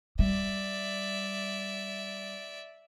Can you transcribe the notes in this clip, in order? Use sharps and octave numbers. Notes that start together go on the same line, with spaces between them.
G3 D5 E5